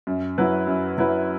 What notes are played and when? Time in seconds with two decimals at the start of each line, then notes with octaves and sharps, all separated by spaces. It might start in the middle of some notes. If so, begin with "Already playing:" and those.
0.07 F#2
0.38 F#3 E4 B4
0.67 F#2
0.98 F#3 E4 B4